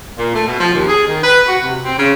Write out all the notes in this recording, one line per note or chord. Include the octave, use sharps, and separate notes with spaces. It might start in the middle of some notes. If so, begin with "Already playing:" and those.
A#2
A3
B2
F3
D#2
G#4
D#3
B4
F#4
C3
C4
C#3